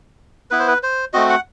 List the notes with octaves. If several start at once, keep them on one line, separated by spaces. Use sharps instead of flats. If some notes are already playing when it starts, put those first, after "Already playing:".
B3 E4 B4
C5
B4
C5
A3 C4 F#4 D#5
F#5